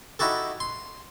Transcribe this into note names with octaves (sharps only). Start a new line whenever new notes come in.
D#4 E4 F#4 G4 A4
C6